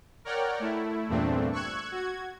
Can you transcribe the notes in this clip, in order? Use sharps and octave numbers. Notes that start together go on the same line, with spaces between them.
A#4 C#5 D5 F#5 G5 F6
A3 E4
E2 G2 A#2 A3 C4 D4
C#6 E6 F#6 G#6
F#4 G#6